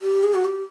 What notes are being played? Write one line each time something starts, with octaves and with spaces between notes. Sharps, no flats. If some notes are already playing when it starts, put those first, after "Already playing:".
G4
G#4
F#4
G4